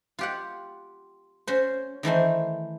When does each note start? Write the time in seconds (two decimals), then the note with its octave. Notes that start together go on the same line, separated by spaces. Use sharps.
0.19 F4 G4 F#5
1.47 C#4 F#4 C5
2.03 D#3 E3 A3 C5